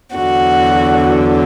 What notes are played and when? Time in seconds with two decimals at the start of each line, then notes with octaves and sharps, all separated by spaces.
0.15 E2 D3 F#3 F#4